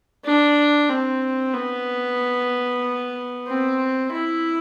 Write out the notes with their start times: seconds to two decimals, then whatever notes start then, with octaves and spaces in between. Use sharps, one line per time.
0.25 D4
0.90 C4
1.54 B3
3.48 C4
4.12 E4